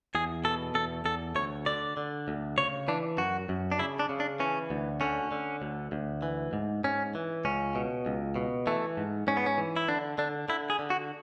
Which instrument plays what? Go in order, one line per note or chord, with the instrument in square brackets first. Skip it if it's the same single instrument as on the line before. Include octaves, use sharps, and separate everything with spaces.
[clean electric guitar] E2 G#4
B2 A4
E2 A4
E2 A4
D2 C#5
D3 D5
D3
D2
C#3 C#5
E3 D4
F#2 F#4
F#2
D4
C#3 E4
D4
C#3
D4
E3 C#4
D2
D3 C#4
D3
D2
D2
E3
G#2
G#2 C#4
E3
C#2 C#4
B2
C#2
B2
E3 A3
G#2
G#2 C#4
B3
C#4
E3
E4
D3 D4
D3 D4
D3 E4
G#4
D3
F#4